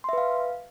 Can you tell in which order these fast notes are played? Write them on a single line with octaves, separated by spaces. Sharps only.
C6 E5 B4 F5